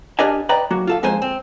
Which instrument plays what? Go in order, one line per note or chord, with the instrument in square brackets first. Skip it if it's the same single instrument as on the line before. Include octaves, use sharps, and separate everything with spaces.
[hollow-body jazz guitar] D4 G4 A#4 D5 D#5 G#5
B4 D5 D#5 G5 A#5
F#3 A#3 F#4
F4 A4 F5
F2 G#3 A#3 C5 G#5
C4